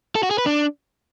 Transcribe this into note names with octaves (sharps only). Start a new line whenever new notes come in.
A4
F#4
G#4
B4
D4